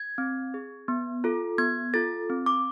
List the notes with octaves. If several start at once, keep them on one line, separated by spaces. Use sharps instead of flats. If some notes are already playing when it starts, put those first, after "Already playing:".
Already playing: G#6
C4
G#4
B3
F4 A4
B3 G#6
F4 A4 A6
C4
D6